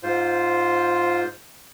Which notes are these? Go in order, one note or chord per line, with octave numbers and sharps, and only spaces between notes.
G#2 F4 C5